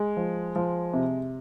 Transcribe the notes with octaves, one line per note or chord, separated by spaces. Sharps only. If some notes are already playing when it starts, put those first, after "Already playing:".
Already playing: G#3
F3
F3
C3